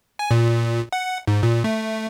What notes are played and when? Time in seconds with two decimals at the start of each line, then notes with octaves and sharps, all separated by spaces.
0.19 G#5
0.31 A#2
0.93 F#5
1.27 G#2
1.43 A#2
1.64 A3